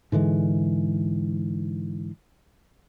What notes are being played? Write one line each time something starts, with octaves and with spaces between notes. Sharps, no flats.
G#2 D3 E3 G#3